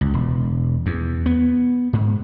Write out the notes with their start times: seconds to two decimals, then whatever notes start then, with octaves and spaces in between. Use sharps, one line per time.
0.01 C#2
0.14 E1
0.86 E2
1.26 B3
1.93 G#2